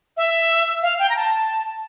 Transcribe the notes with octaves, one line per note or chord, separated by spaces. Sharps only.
E5
F5
G5
A#5
A5